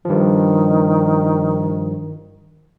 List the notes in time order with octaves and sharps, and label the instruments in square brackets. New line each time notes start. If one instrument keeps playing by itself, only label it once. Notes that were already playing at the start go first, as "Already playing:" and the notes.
[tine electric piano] G2 F3 [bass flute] D#3